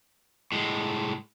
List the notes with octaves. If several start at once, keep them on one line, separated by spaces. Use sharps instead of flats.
A2 G#3